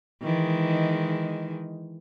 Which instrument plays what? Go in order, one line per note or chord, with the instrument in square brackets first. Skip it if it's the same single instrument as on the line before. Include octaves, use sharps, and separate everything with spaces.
[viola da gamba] D#3 E3 G#3